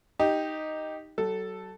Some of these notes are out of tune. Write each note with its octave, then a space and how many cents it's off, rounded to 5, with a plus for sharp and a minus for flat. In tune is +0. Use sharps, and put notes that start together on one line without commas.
D#4 +0 G4 +0
F#3 +40 A4 +0